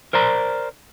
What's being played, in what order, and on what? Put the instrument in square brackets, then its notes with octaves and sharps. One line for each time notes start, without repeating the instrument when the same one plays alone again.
[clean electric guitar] A#4 C5 D5 A#5